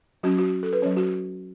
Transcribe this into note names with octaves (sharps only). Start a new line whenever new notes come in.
F#3 C#4 F#4
F#4
A4
B4
F#3 C#4 C#5
F#4